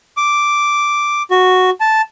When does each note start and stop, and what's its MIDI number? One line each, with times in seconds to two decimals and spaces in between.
0.17 1.23 86
1.31 1.70 66
1.80 2.02 81